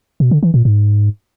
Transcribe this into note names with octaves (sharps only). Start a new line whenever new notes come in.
B2
D3
E3
A#2
G#2